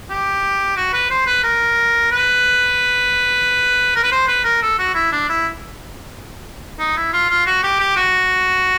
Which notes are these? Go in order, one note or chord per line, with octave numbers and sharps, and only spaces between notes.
G4
F#4
B4
C5
B4
A#4
B4
A#4
B4
C5
B4
A#4
A4
F#4
E4
D4
E4
D#4
E4
F4
F4
F#4
G4
G4
F#4